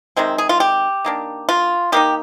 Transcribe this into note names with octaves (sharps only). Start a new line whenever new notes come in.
C3 D#3 G#3 C4
G#4
F4
G4
D#3 A#3 D4
F4
D#3 A#3 D#4 G4